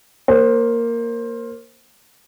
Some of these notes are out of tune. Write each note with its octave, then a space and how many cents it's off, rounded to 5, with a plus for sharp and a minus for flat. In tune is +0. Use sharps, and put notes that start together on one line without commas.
A#3 -5 C5 +20